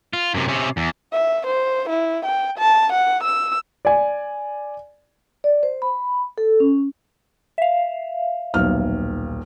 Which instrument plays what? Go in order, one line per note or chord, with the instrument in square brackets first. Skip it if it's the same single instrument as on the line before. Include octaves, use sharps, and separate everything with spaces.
[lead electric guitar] F4
F#2 C3
C3 C#4
E2
[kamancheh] E5
C5
E4
G5
A5
F#5
E6
[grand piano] D5 G#5
[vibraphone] D5
C5
B5
A4
C#4
[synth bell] E5 F5
[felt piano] D#1 B1 F6